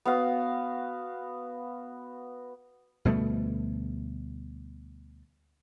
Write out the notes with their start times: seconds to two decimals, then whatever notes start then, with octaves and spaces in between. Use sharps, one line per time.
0.05 B3 F#4 F5
3.05 D2 B2 G3 A3